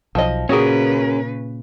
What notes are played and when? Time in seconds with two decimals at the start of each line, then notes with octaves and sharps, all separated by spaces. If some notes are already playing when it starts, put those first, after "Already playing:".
0.15 B1 F3 D#5
0.49 A#2 C#3 C#4 F#4 G#4 A#4 B4